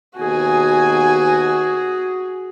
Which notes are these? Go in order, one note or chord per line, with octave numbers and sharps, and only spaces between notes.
D#2 B2 F#4 G#4 G#5